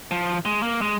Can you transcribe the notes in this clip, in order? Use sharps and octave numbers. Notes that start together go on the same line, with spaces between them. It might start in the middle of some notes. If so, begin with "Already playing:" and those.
F3
G#3
A#3
G#3